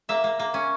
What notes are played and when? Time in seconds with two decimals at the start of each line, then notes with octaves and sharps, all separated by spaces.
0.09 A#3 E5
0.24 A#3
0.39 A#3
0.54 C#4